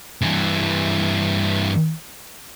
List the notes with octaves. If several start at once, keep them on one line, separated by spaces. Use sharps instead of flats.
G2 E3